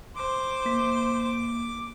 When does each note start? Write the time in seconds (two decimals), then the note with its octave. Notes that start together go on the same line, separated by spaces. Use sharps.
0.16 C5 D6
0.66 A#3 B6